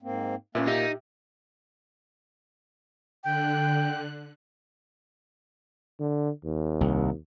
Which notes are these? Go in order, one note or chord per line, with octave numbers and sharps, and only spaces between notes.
G#2 A#3 C4
A#2 A#3 C#4 B4 E5
D#4 G4 E5
D3 G5 F#6
D3
D#2
C2